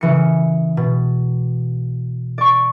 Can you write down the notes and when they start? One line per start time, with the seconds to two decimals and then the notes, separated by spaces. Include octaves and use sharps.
0.01 C#3 E3 C#7
0.77 B2
2.38 D5 C#6